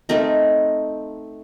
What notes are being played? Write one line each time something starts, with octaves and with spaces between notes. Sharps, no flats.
A3 C4 D#4 A#4